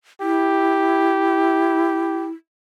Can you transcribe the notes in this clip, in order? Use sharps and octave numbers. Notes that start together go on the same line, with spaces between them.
E4 G4